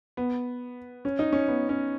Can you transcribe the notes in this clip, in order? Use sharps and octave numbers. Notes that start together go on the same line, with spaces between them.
B3
C#4
D#4
C#4
B3
C#4